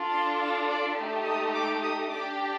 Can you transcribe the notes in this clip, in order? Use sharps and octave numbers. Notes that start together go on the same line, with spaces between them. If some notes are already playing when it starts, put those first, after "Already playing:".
Already playing: D4 F4 A4
C6
F5
D5
A3 D#4 G4
D#6
D6
D#6
D4 G4 D6